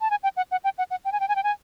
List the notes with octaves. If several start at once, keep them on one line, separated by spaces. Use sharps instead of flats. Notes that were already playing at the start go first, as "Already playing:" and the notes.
A5
G#5
G5
F#5
F#5
G5
F#5
F#5
G5
G#5
G5
G#5
G5
G#5